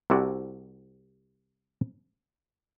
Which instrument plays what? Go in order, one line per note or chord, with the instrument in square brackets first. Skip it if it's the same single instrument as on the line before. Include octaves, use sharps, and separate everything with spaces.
[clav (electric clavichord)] C2 C3 E4 F#4 D5